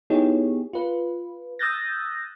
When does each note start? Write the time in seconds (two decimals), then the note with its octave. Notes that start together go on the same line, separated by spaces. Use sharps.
0.10 B3 D#4 E4 G4 G#4 C#5
0.73 F4 B4
1.59 D#6 E6 F#6 G6 A6 A#6